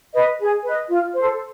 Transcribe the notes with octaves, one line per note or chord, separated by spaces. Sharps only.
B4 D#5
G#4
B4 D#5
F4
A4 C5